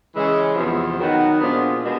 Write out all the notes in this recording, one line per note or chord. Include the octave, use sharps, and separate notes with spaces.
C#3 E3 G#3 C#4
E2 C3 F3
D#3 F#3 B3 D#4 F#4
A#2 F3 G#3 B3 D4
B2 G#3